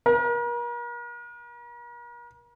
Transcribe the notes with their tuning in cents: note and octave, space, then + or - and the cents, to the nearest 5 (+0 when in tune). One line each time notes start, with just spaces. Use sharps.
A#4 +40